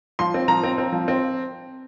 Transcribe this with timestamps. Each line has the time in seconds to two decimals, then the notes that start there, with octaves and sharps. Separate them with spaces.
0.19 F3 C6
0.34 C4
0.48 F3 A#5
0.63 C4
0.78 C4
0.92 F3
1.08 C4